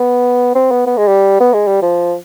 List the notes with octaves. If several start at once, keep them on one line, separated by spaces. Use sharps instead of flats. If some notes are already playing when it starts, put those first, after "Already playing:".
Already playing: B3
C4
B3
B3
G#3
G3
B3
G#3
G3
F3